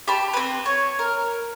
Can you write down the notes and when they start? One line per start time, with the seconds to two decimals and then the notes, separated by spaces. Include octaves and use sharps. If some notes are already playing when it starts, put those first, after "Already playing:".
0.08 G4 A5 B5
0.33 C4 B4
0.66 C#5
0.99 A#4